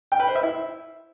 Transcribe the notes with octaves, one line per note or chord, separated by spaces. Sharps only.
G5
B4
C5
E5
E4